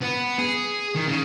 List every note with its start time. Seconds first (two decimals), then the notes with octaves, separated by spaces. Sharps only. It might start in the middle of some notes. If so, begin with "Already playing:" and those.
0.02 B3
0.39 G#4
0.96 D#3
1.07 C#3